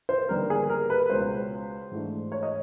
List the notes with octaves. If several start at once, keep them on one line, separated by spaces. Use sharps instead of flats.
C5
D#2 D3 G3 B3 D#4 A#4
G#4
A#4
B4
C#2 B2 G#3 C#4 C5
G#2 E3 A3 D4
C#5
D#5